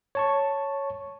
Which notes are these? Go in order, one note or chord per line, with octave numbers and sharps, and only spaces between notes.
C#5 A5 C#6